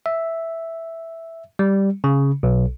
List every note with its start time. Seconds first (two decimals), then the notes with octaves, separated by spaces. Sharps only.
0.06 E5
1.59 G3
2.04 C#3
2.43 B1